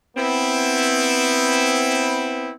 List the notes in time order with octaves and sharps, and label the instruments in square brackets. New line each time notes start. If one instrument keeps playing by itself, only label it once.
[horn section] B3 C4 E4